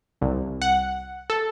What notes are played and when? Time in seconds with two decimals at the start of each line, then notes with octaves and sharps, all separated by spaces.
0.21 C2
0.62 F#5
1.30 A4